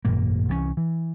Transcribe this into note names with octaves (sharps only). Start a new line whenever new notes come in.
G#1 F#2 A#2 A#3
C2 E3 F3 C#4
E3